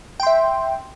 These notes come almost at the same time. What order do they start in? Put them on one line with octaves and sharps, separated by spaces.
G5 C6 E5